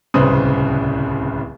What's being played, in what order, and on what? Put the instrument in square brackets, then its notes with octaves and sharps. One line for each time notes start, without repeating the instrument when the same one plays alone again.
[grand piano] D1 C2 C#3 B4 C5 D#6